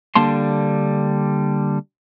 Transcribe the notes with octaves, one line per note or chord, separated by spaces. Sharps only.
D3 G3 A#3 A5 C6